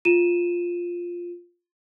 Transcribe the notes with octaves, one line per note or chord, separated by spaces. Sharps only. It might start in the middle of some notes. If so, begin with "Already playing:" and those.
F4 D#7 E7